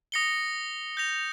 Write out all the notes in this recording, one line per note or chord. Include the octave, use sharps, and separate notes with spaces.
D#6 A#6 C#7 G7
G6 A#6 F7